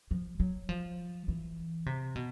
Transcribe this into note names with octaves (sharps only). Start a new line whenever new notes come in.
F3
F#3
F3
E3
C3
B2